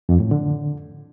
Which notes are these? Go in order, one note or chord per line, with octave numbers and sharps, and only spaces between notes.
F2
A2
D3